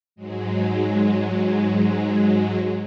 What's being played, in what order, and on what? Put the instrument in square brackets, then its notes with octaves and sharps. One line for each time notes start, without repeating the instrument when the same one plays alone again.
[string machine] G#2 F#3 G#3